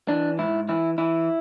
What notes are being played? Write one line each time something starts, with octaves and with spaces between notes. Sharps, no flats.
E3 D4
G#2 E4
E3 E4
E3 E4